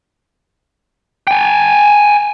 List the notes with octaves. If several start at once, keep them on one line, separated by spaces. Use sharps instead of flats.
G5 G#5